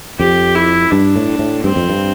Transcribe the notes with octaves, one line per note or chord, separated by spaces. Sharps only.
F2 G4
E4
G2 D4
A2
A2
G2 C4
F2
G2